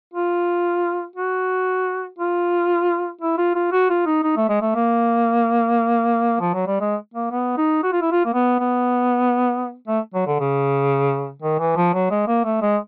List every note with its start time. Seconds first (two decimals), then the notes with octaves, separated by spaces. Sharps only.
0.14 F4
1.16 F#4
2.19 F4
3.21 E4
3.38 F4
3.55 F4
3.72 F#4
3.90 F4
4.06 D#4
4.23 D#4
4.37 A3
4.49 G#3
4.62 A3
4.75 A#3
6.41 F3
6.54 F#3
6.67 G3
6.80 G#3
7.14 A#3
7.32 B3
7.58 D#4
7.83 F#4
7.92 F4
8.02 E4
8.12 F4
8.25 A#3
8.34 B3
8.60 B3
9.88 A3
10.14 F#3
10.27 D3
10.40 C#3
11.42 D#3
11.59 E3
11.76 F3
11.94 F#3
12.11 G#3
12.28 A#3
12.44 A3
12.62 G#3